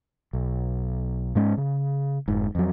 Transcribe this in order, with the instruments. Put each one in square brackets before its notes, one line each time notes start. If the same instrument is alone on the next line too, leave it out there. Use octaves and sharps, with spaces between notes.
[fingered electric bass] B1
G#2 G#3 C#4
C#3
F1 G#2
F2 F#3